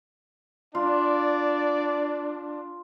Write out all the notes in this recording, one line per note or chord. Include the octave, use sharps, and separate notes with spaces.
D4 F4 D5